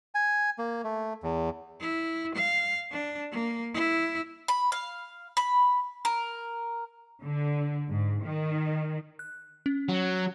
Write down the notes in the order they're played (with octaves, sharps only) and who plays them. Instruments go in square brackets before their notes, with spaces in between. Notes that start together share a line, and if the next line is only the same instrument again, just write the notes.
[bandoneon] G#5
A#3
A3
E2
[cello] E4
F5
D4
A#3
E4
[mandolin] B5
F5
B5
A#4
[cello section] D3
G#2
D#3
[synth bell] F#6
C#4
[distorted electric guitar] F#3